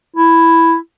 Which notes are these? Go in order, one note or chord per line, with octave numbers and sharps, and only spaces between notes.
E4